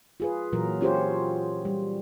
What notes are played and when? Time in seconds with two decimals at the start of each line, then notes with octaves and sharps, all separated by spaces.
0.20 F4 G#4 B4
0.53 A#2 E3 F#3 A#4
0.81 C#4 F4 G4 G#4 C5 C#5
1.65 G3